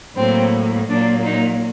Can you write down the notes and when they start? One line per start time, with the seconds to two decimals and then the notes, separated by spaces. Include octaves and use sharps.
0.16 A2 F#3 A#3 C4
0.89 A#2 F#3 A#3 D4
1.25 D#4